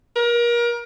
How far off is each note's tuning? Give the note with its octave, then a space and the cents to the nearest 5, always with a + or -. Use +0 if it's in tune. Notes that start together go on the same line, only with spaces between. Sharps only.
A#4 +30